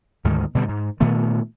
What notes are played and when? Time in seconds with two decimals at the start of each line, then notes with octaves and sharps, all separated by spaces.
0.25 D2 G#2 D#3
0.55 B2 D3 F#3 G3
0.69 G#2
1.00 A#2 D#3 A3 B3